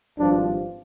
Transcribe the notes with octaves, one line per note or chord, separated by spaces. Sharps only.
G#1 G2 F3 D4